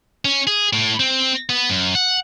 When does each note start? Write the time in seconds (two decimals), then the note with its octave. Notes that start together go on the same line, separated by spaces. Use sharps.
0.25 C#4
0.47 G#4
0.73 A2
1.00 C4
1.50 B3
1.70 F#2
1.95 F#5